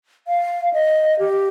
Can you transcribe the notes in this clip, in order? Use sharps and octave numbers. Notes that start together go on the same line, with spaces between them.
F5
D#5
G4